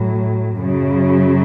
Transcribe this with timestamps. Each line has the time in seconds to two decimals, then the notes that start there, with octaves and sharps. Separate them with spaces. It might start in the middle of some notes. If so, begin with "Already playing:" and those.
Already playing: A2 F#3
0.58 F#2 C#3 F#3